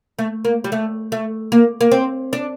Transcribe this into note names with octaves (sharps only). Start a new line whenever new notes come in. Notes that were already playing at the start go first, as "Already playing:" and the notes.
A3
A#3
G3
A3
A3
A#3
A#3
C4
D4